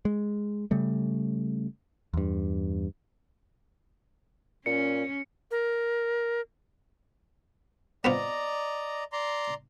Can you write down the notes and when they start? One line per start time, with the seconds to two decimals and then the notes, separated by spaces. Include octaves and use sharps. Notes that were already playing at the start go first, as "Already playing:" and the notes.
0.05 G#3
0.71 C#3 G3 A3
2.14 E2 G2
4.66 A#2 C#4 C#7
5.51 A#4
8.05 B3 C4 F4 D5 D#5 A#5
9.12 D5 A#5 C6